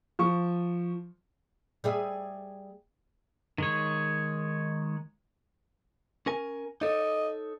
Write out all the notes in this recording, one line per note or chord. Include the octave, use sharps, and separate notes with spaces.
F3 C#6
G3 G#4 E5
D#3 G#3 C#5
C#4 A#4 G#5
D#4 A4 C#5 D#5